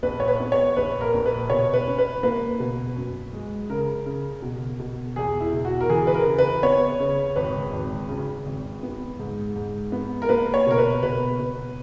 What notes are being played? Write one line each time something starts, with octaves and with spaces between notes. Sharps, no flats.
A#1 B4
C#5
B4
B3
C#5
A#1 B4
A#4
A#1
B4
B2 C#5
B4
C#4
B4
A#3 B4
B2
F#2
G#3
C#3 A#4
C#3
B2
B2
E2 G#4
E4
B2
F#4
A#4
E3 G#4
B4
A#4
C#3
B4
B3 C#5
C#3
G#1 B4
G#1
C#3
G#1
B3
G#2
G#2
B3
A#4
A#3 B4
C#5
B2 A#4
B4
B2 B4
B2